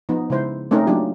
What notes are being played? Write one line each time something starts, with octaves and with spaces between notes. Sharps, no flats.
F3 B3 D#4
C#3 G#3 E4 C5
A3 C4 C#4 D#4 A#4
F#3 A#3 D4 D#4 F4 G4